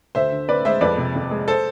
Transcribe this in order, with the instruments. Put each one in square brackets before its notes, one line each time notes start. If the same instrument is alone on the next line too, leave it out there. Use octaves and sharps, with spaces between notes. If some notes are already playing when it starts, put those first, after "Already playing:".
[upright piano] D2 C5 E5
D3
C4 B4 D5
G#3 C5 E5
F2 B4 D5
C3
F2
G#3
A4 C5